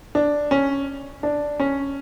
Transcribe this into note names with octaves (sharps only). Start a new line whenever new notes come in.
D4
C#4
D4
C#4